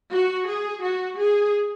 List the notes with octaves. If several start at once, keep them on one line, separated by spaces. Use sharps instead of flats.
F#4
G#4
F#4
G#4